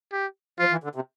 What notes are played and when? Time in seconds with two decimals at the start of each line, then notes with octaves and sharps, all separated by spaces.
0.12 G4
0.59 F3 F4
0.72 E3
0.84 D3
0.95 C3